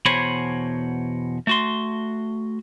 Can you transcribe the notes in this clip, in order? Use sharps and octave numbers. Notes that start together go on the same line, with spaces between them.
E2 B2 C5 C#5 G#5 B5
A3 F#4 C6